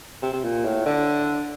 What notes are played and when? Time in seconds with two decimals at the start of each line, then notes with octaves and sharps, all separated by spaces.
0.22 C3
0.33 C3
0.44 A#2
0.65 A2
0.86 D3